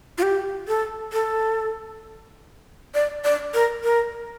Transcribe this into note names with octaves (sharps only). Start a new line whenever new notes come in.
F4
G4
A4
A4
D5
D5
A#4
A#4